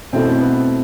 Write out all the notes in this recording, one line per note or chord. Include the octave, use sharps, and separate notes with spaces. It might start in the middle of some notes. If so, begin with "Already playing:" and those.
B2 A3 C4 E4 A4
C4
B3